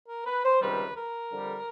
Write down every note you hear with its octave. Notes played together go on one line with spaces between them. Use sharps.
A#4
B4
C5
C#2 C3 D#3 G3 B4
A#4
F2 D3 G3